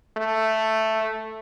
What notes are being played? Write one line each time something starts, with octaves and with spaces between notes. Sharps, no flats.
A3